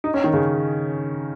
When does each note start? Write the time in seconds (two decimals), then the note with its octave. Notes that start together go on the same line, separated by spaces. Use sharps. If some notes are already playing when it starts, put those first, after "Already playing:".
0.04 D#4
0.14 C#4
0.24 D#3
0.33 C#3